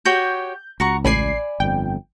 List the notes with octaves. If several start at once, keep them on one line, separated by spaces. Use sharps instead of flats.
F#4 G4 C#5 G6
C#2 F#4 A#5 C#6
A1 D5 G#5 B5 C7
G1 F2 G5